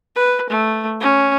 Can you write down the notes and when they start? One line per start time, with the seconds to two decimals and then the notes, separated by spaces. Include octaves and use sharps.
0.16 B4
0.50 A3
1.01 C#4